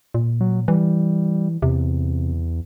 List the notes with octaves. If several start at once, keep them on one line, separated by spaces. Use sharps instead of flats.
A#2
F#3
E3 G3
E2 C3